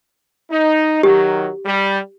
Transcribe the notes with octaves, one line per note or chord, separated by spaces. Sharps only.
D#4
D#3 F#3 G4
G3